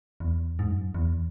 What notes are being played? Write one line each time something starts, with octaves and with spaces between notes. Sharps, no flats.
E2
G#2
F#2
E2